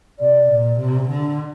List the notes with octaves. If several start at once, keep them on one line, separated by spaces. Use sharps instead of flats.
C3 D5
A#2
C3
D3